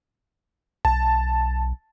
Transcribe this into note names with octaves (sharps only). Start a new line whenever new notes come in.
B1 A5